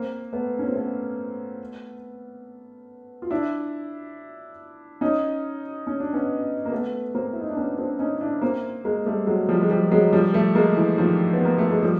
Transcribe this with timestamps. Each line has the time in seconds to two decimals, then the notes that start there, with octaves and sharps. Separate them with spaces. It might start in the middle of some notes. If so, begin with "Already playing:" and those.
Already playing: A#3 C4
0.33 A3 B3
0.59 C#4
0.67 C4
0.75 A3 B3
3.22 F4
3.31 D4 E4
5.01 C#4 D#4
5.87 C#4
6.00 D4
6.14 B3 C#4
6.65 A#3
6.72 A3 B3
7.15 A#3 C4
7.33 E4
7.41 D#4
7.49 D4
7.57 B3 C#4
7.78 C4 D4
7.99 C#4 D#4
8.21 D4 E4
8.42 A#3 C4
8.84 G#3 A#3
9.06 G3 A3
9.27 F#3 G#3
9.49 F3 G3
9.61 G#3
9.70 F3 G3
9.91 F#3 G#3
10.13 F3 G3
10.34 G3 A3
10.55 G#3 A#3
10.77 E3
10.98 D#3 F3
11.33 B3
11.45 A#3
11.58 A3
11.70 G#3
11.83 F3 G3